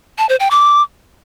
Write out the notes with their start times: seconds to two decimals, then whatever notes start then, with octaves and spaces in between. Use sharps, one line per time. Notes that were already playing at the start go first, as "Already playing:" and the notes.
0.18 A5
0.29 C5
0.40 G5
0.51 D6